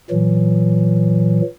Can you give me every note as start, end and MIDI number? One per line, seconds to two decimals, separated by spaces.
0.10 1.41 46
0.10 1.41 52
0.10 1.41 54